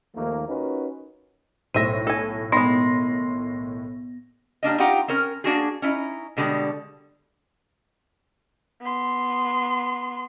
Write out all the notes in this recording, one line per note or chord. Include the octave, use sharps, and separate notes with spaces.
D#2 D#3 F3 A3 A#3
C#4 D#4 F4 F#4 A#4 B4
B1 A2 C5 E5 A#6 D#7
A4 G#5
D#3 G#3 B3 C6 A#6
G3 A#3 D4 D#5
C4 D#4 F4 G4 F#5 A#5
C4 C#4 A#4
A#3 D4 F#4 G#4
C#4 D#4 E4
B2 D3 G3 G#3
B3 C6